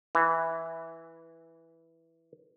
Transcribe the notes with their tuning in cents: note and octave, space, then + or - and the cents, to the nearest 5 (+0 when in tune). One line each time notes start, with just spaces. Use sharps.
E3 -5